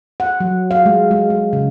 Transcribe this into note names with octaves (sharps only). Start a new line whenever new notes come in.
F#5
F#3
F5
G#3
G#3
G#3
C#3